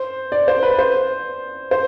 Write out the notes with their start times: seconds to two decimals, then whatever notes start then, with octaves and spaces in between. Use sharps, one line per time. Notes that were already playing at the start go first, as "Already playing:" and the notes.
Already playing: C5
0.32 D5
0.48 C5
0.63 B4
0.79 C5
1.71 C5